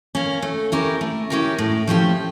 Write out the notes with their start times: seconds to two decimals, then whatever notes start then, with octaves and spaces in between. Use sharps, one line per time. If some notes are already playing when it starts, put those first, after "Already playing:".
0.15 A#3 C#4
0.42 A3
0.72 C#4 E4 G4 A#4
1.01 A3
1.30 C#4 E4 G4 A#4
1.58 A2
1.87 F3 A3 C#4 G4